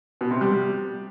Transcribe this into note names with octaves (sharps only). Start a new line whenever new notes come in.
B2
C3
G3